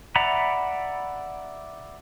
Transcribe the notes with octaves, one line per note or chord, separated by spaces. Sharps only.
D5 E5 F#5 A#5 B5